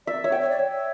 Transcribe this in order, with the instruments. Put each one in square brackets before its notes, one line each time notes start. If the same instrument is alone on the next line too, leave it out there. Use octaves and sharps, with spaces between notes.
[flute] D5 [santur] E5
[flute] C#5 [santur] E5
[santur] G5
[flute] C#5
D5
C#5